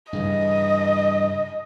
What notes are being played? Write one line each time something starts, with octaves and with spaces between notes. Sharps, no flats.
G2 C#3 E3 D#5